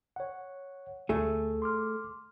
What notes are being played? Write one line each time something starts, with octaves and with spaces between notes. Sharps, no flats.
C#5 F#5
D2 A3 G#4
C6 D6 F6